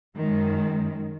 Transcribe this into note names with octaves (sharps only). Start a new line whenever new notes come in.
F#2 D#3 G#3